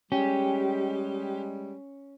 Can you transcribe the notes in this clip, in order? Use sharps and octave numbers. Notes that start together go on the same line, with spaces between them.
G3 G#3 C#4 G4